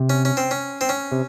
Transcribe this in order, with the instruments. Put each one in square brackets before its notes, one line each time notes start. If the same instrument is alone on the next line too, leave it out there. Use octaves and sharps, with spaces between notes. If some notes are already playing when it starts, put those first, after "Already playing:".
Already playing: [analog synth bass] C3
[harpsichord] C#4
C#4
C4
C#4
C4
C#4
[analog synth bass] C3